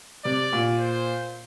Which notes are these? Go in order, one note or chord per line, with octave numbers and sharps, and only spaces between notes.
C3 D5
A#2
C5